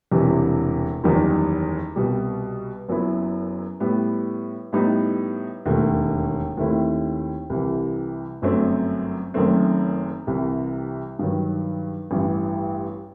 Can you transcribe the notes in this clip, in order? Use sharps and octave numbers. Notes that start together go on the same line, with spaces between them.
E1 E2 C3 E3 G3
F#1 E2 D#3 G3 D#4
C2 B2 G3
F#1 F#2 F#3 B3 E4
A2 G3 B3
A2 G3 B3 D#4
E1 D#2 D#3 A3
D#2 D#3 A3 C4 E4
C2 C3 E3
G1 F#2 F#3 A3 C4
F#1 F#2 D#3 A3 C4
C2 C3 E3
G2 D#3 F#3
A1 G2 E3 G3